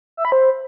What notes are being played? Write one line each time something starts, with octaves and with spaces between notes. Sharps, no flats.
E5
B5
C5